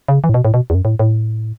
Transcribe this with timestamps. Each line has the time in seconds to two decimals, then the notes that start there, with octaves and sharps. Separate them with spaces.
0.08 C#3
0.24 E3
0.29 A2
0.34 B2
0.45 A2
0.54 B2
0.70 E2
0.75 F#2
0.85 A2
0.99 A2